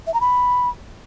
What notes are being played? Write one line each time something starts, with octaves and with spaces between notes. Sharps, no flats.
E5
A#5
B5